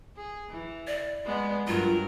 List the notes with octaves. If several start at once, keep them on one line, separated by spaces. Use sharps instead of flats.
G#4
E3
D5
G#3 B3
G2 F#3 F4 A#4